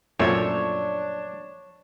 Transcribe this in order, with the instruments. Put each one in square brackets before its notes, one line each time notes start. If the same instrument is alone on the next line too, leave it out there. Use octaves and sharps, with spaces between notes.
[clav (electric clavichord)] F#2 A#2 A3 [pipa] F3 E5 [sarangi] D4 [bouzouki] C#5